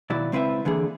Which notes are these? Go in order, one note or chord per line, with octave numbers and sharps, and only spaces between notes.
D#2 B2 F#3 E4 D5
C#2 C4 E4 B4 E5
D3 E3 A#3 G#4